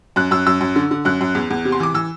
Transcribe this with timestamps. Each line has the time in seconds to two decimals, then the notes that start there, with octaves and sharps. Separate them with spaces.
0.16 F#2 F#6
0.31 F#2 E6
0.46 F#2 E6
0.61 F#2
0.76 D3
0.91 D3
1.05 F#2 F#6
1.21 F#2
1.35 E2
1.50 E2
1.65 C3
1.72 C6
1.80 E3 D6
1.94 E3 E6